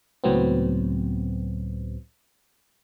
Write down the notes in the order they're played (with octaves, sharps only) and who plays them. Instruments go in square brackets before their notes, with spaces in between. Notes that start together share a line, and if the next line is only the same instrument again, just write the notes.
[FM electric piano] C#2 A2 F#3 B3 C4